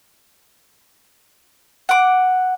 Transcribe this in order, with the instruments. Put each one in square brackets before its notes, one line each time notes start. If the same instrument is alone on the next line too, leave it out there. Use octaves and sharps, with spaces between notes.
[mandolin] F#5 D6